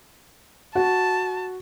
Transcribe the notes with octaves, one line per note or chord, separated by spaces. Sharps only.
F#4 A5